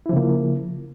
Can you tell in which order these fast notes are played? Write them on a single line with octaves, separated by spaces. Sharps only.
E4 F3 C#3 A#3